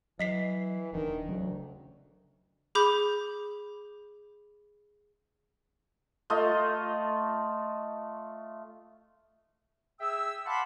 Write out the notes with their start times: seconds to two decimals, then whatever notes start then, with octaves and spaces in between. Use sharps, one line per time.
0.19 E3 F#3 D#5 B6 C7
0.93 D#1 D#3 E3 D4
1.29 D2 C#3 F#3 C#4
2.75 G#4 B5 D6 G6
6.30 A3 F4 D#5
10.00 G#4 E5 G5 E6
10.46 F5 F#5 A5 B5 C6 D6